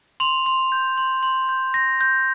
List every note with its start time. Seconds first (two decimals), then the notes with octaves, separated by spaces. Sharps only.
0.20 C6 F7
0.46 C6
0.72 G6
0.98 C6
1.23 C6
1.49 G6
1.74 G6 A#6
2.01 G6